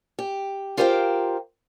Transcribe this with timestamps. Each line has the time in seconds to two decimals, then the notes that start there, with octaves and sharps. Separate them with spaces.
0.19 G4
0.77 F4 G4 A#4 C5 F5 G5